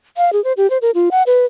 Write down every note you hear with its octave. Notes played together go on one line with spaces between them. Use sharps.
F5
G#4
C5
G4
C5
A#4
F4
F#5
B4